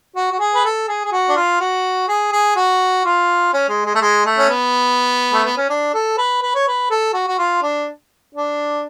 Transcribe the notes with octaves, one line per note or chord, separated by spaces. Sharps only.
F#4
F#4
G#4
B4
A4
G#4
G#4
F#4
D4
F4
F#4
G#4
G#4
F#4
F4
C#4
G#3
G#3
A3
G#3
A3
C#4
B3
A3
B3
C#4
D4
A4
B4
B4
C#5
B4
A4
F#4
F#4
F4
D4
D4